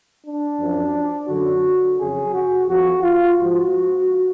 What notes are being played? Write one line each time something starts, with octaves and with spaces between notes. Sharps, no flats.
D4
F#2 F3
F#2 D3 F#3 F#4
F2 C#3 F#3 G#4
F#4
F2 F3 F#4
F4
G#2 F3 F#4